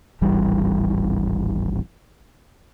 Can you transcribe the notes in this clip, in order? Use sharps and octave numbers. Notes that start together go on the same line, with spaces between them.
D1 G#1 E3 G3